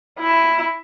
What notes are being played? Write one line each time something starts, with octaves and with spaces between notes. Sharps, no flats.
E4